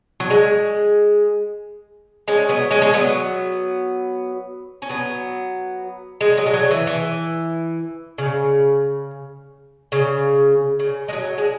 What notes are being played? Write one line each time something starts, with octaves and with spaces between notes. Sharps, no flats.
F#3
G#3
G#3 C#4
F#3 B3
G#3 C#4
G#3
F#3 B3
C#4
F#3 B3
G#3
F#3
G#3
F#3
E3
E3
C#3
C#3
C#3
G#3
F#3
G#3